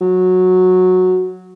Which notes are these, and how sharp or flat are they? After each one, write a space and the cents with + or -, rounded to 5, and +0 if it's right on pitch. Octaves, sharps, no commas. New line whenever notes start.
F#3 -10